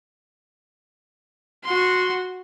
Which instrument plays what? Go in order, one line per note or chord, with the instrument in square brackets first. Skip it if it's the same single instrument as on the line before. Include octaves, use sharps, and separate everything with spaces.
[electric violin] F#4 C6